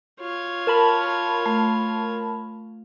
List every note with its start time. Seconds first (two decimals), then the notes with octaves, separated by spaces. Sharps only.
0.20 F4 C#5
0.67 A#4 A5 B5
1.46 A3